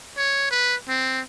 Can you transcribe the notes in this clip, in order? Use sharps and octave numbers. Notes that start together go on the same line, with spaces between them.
C#5
B4
C4